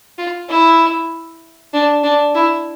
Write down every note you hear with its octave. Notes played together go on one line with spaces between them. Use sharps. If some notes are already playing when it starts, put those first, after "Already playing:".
F4
E4
D4
D4
E4